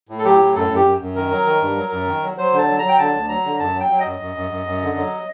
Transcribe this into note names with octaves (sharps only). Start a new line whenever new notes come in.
A2
A4
F#3 G4
A2
F#2 A4
F#2
G4
F#2
F#2
D#3 A#4
F#3
D#3
G2
F#3
F#2
D#3
F#3
F#3 C5
D3
A5
F#3
F#3 A#5
G5
D3 A5
D2
F#3 A#5
D3
F#2 A5
F#3
G5
F#3
D#5
F#2
F#2
F#2
F#2
F#2
D3
F#3